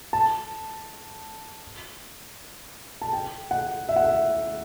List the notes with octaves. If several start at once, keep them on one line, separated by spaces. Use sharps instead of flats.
A5
A5
G5
F#5
E5
F#5
E5